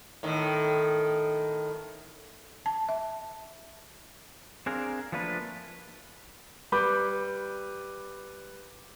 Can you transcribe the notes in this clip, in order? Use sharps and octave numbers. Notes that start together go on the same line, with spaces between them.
A2 D#3
A5
E5
C4 D4 G#4 A#4 F5
F3 A3 A#3 D4 B4
G3 B4 B5 D6 G6